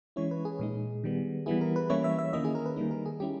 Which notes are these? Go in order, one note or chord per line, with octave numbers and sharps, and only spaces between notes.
E3 G#3 C#4 E4 C#5
B4
G#4
A#2 G#3 D#4
D#3 G3 B3
E3 G3 B3 E4 G#4
A#4
B4
E3 G3 A#3 C#4 E4 C#5
E5
E5
D#3 A#3 C#4 E4 D#5
G#4
A#4
B4
D#3 G3 A#3 D#4
A#4
G#4
G3 C#4 E4 G4